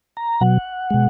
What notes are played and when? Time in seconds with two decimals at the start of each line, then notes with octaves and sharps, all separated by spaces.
0.17 A#5
0.41 B2 F#3 F#5
0.90 B2 G#3